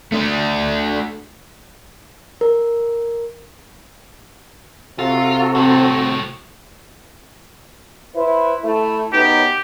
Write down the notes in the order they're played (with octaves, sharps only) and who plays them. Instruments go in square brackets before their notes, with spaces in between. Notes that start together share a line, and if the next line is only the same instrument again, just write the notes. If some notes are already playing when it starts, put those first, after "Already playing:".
[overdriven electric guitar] A3 D4
[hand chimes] A#4
[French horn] C3 [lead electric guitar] F4 [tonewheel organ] F#4 A4
[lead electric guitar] C2 A2 [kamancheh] C4
[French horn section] E4 B4 C5
A3 E4
[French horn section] F#2 B3 D#4 [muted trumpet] G4